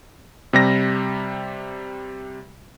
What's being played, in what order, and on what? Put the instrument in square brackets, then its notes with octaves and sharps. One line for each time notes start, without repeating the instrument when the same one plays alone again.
[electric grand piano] C3 G3 A#6